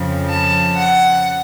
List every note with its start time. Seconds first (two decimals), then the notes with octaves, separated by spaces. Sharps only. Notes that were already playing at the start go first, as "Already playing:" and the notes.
Already playing: F2 C#3 F3
0.29 A5
0.77 F#5